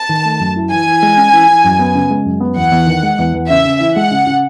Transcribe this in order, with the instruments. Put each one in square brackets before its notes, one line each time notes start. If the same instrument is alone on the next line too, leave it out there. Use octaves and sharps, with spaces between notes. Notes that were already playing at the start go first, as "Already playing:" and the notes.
Already playing: [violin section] A5
[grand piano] D#3
A3
F#2
E4
[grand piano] E3 [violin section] G#5
[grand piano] E3
G#3
C#4
E3
E3
F#2
B3
C#3
G#3
F#2
B3
[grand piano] E2 [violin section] F#5
[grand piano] E2
D#3
G#3
E2
E2
[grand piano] C#3 [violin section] E5
[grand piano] C#3
E3
[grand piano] G#3 [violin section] F#5
[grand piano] C#3
C#3